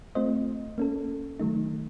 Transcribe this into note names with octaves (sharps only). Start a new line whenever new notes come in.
A3 C4 F4 C5 D#5
A#3 C#4 A4
D#3 F#3 A3 D#4